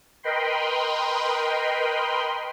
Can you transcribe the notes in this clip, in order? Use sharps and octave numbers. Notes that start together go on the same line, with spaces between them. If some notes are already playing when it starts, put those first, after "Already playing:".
A#4 B4 D#5 G5 B5 C6